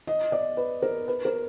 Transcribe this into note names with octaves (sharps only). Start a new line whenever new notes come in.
D#5
D5
B4
A#4
B4
A#4